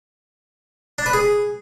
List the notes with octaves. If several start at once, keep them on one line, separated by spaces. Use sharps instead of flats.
D4
B4
G#4